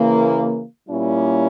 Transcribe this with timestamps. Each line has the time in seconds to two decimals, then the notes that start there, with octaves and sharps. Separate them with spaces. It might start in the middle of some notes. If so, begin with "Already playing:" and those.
Already playing: C#3 E3 A#3
0.89 A#2 G3 A#3 C#4 E4